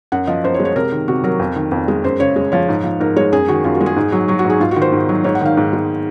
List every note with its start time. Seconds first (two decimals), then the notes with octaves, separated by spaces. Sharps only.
0.12 F#2 F#5
0.27 F3 D#5
0.44 F#2 C5
0.54 C#5
0.60 G#3
0.65 C#5
0.76 C3 A#4
0.92 D#3
1.08 C3 F#4
1.23 F#3 A#4
1.39 F2
1.56 D#3
1.72 F2
1.88 G#3
2.04 F#2 C5
2.20 C#3 C#5
2.36 G#3
2.52 F3 C#5
2.69 G#2
2.84 F3
3.00 G#2 A#4
3.16 G#3 C#5
3.32 F#2 G#4
3.48 D#3 F#4
3.64 F#2 F4
3.75 F#4
3.81 G#3
3.86 G#4
3.96 G#2
4.12 F#3
4.28 F#3 F#4
4.39 F#4
4.45 G#2
4.50 G#4
4.60 G#2 F4
4.71 F#4
4.76 D#3
4.82 C5
4.92 G#2
5.09 F#3
5.24 G#2 C#5
5.35 F#5
5.41 D#3 F5
5.57 G#2
5.73 G#3